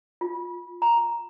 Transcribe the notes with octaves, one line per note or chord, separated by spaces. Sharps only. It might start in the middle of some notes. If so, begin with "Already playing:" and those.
F4
A#5